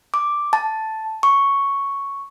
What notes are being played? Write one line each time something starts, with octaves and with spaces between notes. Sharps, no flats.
D6
A5
C#6